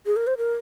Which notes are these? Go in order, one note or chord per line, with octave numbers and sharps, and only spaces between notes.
G#4
A#4
C5
A#4